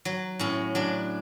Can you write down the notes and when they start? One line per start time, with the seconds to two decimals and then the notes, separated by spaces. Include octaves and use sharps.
0.05 F#3
0.39 A2 C#4
0.75 F#3 D4